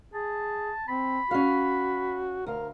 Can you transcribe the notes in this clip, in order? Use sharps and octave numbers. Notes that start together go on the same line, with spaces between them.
G#4 A5
C4 B5
C#4 F#4 F5
D2 A#4 F5